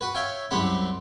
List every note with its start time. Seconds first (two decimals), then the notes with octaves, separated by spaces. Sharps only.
0.01 F#4 B4
0.15 C#5 E5 F5 G5
0.51 C2 F#2 C4 G4 F#5 B5